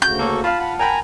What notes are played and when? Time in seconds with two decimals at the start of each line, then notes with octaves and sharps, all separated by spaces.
0.02 D2 C#3 F#4 G6
0.19 A#3 C#4 A4 C#6
0.44 F4 F5 A5 B5
0.59 F#5 A5 B5
0.79 A#4 G5 G#5 A#5 B5